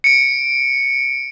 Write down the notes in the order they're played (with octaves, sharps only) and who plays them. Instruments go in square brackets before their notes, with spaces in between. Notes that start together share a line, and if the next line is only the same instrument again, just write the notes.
[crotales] C#7 D7